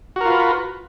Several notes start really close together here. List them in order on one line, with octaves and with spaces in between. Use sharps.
F#4 A#4 F4 B4